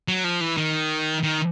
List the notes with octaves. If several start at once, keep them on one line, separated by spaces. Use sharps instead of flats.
F#3
F3
E3
D#3
D#3